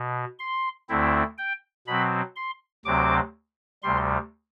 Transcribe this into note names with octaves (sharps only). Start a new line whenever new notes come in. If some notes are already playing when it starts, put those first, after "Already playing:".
Already playing: B2
C6
D2 D3 A3 C4 E4
G5
B2 F#3 C4 B5
C6
D2 C3 F#3 C4 D6
D2 C3 G3 C6